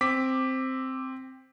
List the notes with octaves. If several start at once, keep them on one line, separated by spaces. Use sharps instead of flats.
C4 D6 B6